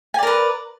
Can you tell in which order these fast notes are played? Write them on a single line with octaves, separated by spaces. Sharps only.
G#5 D5 A#4 B4